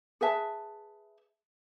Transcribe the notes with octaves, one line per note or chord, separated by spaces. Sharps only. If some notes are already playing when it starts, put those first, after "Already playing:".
G#4 B4 E5 A5